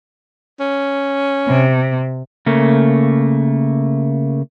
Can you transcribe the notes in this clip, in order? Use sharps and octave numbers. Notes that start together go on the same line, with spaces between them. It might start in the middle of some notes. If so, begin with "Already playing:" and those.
C#4
C3
C#3 A3 A#3